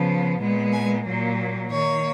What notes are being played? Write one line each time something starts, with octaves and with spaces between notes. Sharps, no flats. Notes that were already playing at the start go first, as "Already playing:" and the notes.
Already playing: C#3 F3 B3
A#2 G#3 B3
G#5
A#2 F#3 A#3
D#3 A#3 C#5